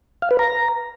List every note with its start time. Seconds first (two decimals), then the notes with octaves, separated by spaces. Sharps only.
0.22 F5
0.31 B4
0.39 A#5